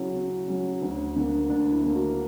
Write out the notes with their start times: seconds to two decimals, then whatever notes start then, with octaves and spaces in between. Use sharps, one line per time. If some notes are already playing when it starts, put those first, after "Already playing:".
Already playing: C#3 F#3 C#4 E4 F#4
0.14 C#3
0.48 F#3 C#4
0.82 D2
1.16 D3 A#3
1.49 D2 D4
1.72 E4
1.83 D3 A#3
1.96 F#4